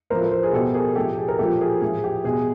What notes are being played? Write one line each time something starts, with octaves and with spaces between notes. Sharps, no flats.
A2 F3 A#4 C5
A4 B4
A#4 C5
G#4
B2 G4 A4
G#4 A#4
A2 F3 G4 A4
G#4
A#4
A#2 F3 G4 A4
G#4 A#4
A2 F3 G#4
G4
B2 G#4